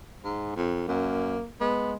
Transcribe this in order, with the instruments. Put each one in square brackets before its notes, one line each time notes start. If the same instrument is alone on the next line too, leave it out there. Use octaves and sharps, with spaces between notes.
[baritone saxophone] G#2
F2
[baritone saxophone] F#2 [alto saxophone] A#3
[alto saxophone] G#3 [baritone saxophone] B3